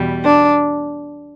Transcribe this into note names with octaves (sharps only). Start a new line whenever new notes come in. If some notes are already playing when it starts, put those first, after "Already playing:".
Already playing: E2 B2 G3
D4